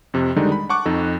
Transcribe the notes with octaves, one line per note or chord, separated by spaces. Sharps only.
F2 C3
D3 D#3 G3 G#3 D4 D#4
B5
F#5 A5 C#6 D6 F#6
F2 D#4 A4